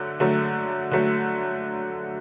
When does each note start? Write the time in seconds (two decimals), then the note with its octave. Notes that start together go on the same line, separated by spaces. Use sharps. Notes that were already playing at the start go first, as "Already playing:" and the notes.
Already playing: D3 F#3 A3
0.20 D3 F#3 A3
0.91 D3 F#3 A3